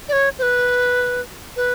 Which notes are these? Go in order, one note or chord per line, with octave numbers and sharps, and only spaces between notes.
D5
C#5
C5
B4
B4